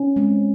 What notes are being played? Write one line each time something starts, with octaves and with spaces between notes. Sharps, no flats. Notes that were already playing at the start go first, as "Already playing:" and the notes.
Already playing: C#4
G#3 C4